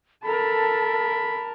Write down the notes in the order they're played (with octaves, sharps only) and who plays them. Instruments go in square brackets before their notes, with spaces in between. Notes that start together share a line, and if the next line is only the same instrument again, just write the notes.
[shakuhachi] A4 [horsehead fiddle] A#4 A5 [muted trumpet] B5